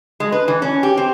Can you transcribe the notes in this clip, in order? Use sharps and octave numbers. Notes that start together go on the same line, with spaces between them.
G#3
B4
E3
C#4
G4
C4